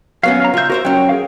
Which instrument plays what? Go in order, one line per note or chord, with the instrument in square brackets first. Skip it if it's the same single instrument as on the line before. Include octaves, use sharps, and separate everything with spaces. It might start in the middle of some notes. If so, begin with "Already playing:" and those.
[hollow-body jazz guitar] F#3 B3 C#4 [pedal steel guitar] F5
[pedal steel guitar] F5 A#5
[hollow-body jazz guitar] C#2 E5 [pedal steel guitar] F4 G6
[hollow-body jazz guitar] F4 C5 E5 [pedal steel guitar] F#4 A#4
[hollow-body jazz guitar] F#3 C#4 [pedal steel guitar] G5
[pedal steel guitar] G#4 A#4 F5